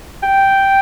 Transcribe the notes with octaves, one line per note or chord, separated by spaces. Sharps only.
G5